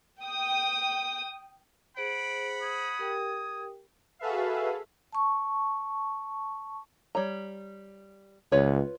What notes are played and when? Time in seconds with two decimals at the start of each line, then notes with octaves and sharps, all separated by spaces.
0.22 G5 D#6
1.97 G#4 C5 F#5 B5 D7
2.62 D#6 G#6
2.99 G4 A#4 G5
4.19 F#4 G#4 A4 B4 E5 F5
5.13 A5 C#6
7.15 G3 C#5 A#5
8.52 C#2 F4 B4 C#5